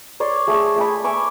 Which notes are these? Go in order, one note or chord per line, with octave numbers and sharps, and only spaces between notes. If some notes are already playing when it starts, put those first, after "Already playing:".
C#5 D5 C6
A3 G#4
A3 G5 G#5 B5
E5 G#5 C#6 D6